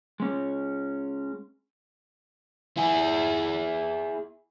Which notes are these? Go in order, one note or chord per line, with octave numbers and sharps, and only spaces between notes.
G#3 C#4
E4 G#4